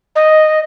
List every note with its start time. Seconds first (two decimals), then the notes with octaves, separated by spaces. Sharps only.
0.16 D#5